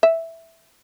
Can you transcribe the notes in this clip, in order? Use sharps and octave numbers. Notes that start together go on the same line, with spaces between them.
E5